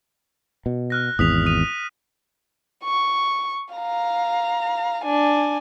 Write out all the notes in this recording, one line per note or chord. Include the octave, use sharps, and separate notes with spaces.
B2
F6 F#6 A#6
G#1 E2 D#6 B6 F7
D#6 D#7 F7
C#6
F5 A#5
D4 G#5